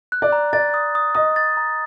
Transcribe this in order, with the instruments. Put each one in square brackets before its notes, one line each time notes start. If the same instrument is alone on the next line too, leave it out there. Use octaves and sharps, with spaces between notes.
[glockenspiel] F#6
[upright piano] D5
[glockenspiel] A#5
[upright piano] D5 [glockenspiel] A6
[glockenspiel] D#6
D#6
[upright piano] D#5 [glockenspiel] D#6
[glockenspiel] A6
A#5